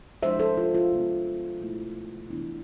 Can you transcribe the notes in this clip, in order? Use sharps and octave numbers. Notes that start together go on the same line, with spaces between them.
F3 G#3 D4 C5 E5
A4 C5
F4
F4
C3 G#3 B3
B2 A3 E4
C3 E3 B3 D4 E4